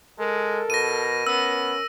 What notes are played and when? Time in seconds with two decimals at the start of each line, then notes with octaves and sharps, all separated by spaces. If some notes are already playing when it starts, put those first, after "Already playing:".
0.19 G#3 A4 A#4
0.70 B2 A#6 D#7
1.27 B3 C#4 E6